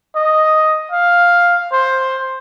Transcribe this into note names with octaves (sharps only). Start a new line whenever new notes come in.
D#5
F5
C5